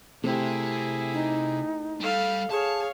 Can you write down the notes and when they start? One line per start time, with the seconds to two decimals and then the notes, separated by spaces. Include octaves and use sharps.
0.24 C3 A3 C4 E4 G4 G#4
1.14 D#4
2.00 G3 A4 F5
2.51 G#4 C#5 F5 A5